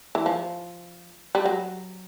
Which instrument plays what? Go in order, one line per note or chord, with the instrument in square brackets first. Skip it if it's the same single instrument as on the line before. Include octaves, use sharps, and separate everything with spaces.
[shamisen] E3
F3
G3
F#3